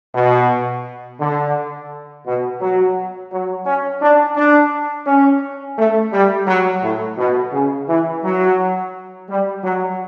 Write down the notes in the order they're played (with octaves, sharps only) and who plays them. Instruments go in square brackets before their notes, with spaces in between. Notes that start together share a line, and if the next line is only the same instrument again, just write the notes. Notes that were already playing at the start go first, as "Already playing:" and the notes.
[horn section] B2
D3
B2
F#3
F#3
C#4
D4
D4
C#4
A3
G3
F#3
A2
B2
C#3
E3
F#3
G3
F#3